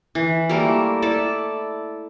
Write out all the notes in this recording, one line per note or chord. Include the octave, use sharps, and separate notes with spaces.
E3
G3 A3 A#3 A#4
E4 A4 D5